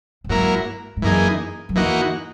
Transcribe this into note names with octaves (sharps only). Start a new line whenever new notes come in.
F#2
G#2 F#3 A#3 E4 A#4
G#2
F#2 E3 A#3 D#4 G#4
F#2
E2 E3 A#3 D#4 F#4